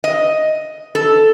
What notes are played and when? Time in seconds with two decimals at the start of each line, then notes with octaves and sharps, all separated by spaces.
0.04 D#5
0.95 A4